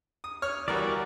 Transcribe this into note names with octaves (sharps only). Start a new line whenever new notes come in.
D#6
C#5 F6
E3 G3 F#4 A#4 D5